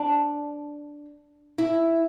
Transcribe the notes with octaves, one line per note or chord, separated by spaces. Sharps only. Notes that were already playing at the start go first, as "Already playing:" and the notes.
Already playing: D4
E4